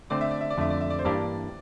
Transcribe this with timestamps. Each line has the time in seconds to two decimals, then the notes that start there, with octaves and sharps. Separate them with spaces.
0.10 D3 A3 C4 D5
0.21 E5
0.31 D5
0.41 E5
0.50 D5
0.58 F2 D3 A3 E5
0.70 D5
0.81 E5
0.90 D5
0.99 C5
1.05 G2 E3 A#3 D4 G4 D5